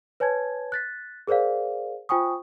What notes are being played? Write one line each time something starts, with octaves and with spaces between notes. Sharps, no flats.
B4 C#5 G#5 A5 G#6
F#6 A6 B6
G#4 A#4 C5 D5 F5
F4 C5 G5 G#5 C#6 D#6